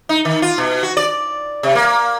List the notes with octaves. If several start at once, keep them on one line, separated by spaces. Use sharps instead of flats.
D#4
D#3
F4
B2
F#4
D5
C3
A#3